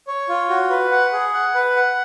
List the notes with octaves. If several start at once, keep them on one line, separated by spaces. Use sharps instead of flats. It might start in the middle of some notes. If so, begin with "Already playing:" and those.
C#5
F4
F#4
B4
F#5
G#4
F#5
B4
F#5